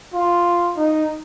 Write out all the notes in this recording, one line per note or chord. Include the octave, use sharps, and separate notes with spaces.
F4
D#4